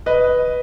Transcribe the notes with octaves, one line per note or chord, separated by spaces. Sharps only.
B4 D#5